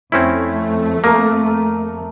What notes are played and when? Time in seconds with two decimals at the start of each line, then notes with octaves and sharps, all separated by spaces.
0.12 F2 A3 C4 C#4 E4
1.04 A#3 A4 A#4 D#6